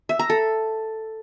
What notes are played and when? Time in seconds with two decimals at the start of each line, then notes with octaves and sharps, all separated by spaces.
0.09 E5
0.19 A#5
0.30 A4